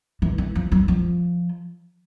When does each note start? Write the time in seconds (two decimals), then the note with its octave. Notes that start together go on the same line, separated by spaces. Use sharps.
0.22 E3
0.38 E3
0.55 F3
0.72 F#3
0.88 F3